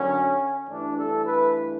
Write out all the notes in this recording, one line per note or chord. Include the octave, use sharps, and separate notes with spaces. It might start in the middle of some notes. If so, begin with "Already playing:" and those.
Already playing: F#2 D3 F#3 C#4
G2 E3 A3 D4
A4
B4